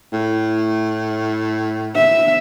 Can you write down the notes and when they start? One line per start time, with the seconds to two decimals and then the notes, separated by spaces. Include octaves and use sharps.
0.13 A2
1.95 E5